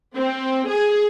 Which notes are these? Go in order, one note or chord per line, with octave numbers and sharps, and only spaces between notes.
C4
G#4